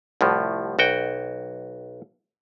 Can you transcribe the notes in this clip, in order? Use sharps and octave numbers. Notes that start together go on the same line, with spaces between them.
C2 A2 F3
B1 F#4 G5